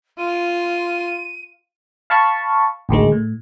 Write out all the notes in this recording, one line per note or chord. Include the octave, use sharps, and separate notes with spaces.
F4 D#7
F5 A5 B5 C#6
A1 D2 D#3 G#3
A2